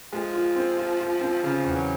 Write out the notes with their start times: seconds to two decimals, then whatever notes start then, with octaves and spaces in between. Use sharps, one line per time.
0.12 F3 G#3
0.34 F4
0.56 C4
0.77 F4
1.00 F4
1.21 C4
1.43 C#3 F3
1.65 E2
1.75 F#3